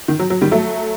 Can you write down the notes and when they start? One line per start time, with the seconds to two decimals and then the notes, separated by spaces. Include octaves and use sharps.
0.08 D#3
0.19 F#3
0.30 F#3
0.42 D#3 G3
0.51 F#3 A3